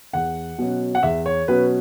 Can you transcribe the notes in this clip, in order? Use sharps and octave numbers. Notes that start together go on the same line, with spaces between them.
E2 F#5
B2 F#3 C#4
F#5
E2 E5
C#5
B2 F#3 C#4 B4